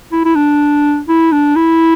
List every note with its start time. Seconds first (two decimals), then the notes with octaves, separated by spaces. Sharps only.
0.12 E4
0.25 E4
0.36 D4
1.08 E4
1.32 D4
1.56 E4